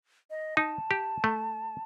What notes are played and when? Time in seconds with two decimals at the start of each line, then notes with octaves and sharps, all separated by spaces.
0.30 D#5
0.57 D#4 A5
0.91 G4
1.24 A3